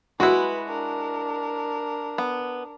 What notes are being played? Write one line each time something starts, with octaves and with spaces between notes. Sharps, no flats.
G#3 E4 F#4 B4
D4 A#4
B3